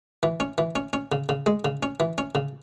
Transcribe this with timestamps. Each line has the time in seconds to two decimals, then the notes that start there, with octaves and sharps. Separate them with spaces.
0.23 E3
0.40 C#4
0.58 E3
0.76 C#4
0.93 C#4
1.12 C#3
1.29 C#3
1.46 G#3
1.65 C#3
1.83 C#4
2.00 E3
2.18 C#4
2.35 C#3